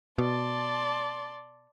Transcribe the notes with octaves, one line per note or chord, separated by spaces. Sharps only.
B2 D5 A5 C6